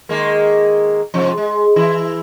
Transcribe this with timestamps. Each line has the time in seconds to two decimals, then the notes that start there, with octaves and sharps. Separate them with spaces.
0.09 D#3 G#3 A#3
1.14 G#2 C3 F3
1.37 G#3
1.76 E3 E4